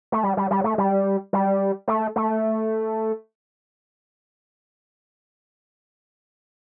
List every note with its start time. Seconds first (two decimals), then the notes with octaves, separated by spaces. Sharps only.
0.12 A3
0.23 G3
0.37 G3
0.51 G3
0.64 A3
0.78 G3
1.33 G3
1.88 A3
2.16 A3